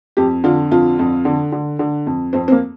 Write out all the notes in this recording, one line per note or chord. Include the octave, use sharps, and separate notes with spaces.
F2 G4
D3 F4
F2 F4
F2
D3
D3
D3
F2
F2 C4
C4
A#3